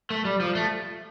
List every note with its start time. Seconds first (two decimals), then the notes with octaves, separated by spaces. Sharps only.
0.10 A3
0.25 G3
0.40 F3
0.55 A3